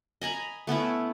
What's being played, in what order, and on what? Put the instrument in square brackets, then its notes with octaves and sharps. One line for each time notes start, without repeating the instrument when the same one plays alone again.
[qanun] D#5 G#5 A#5 B5
A3 B3 C#4 E4